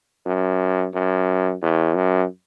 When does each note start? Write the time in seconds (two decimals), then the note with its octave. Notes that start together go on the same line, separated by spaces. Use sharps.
0.26 F#2
0.94 F#2
1.62 E2
1.95 F#2